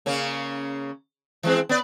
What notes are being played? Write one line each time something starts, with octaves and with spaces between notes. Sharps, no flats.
C#3 A#3 C#4
E3 G#3 C4
B3 D5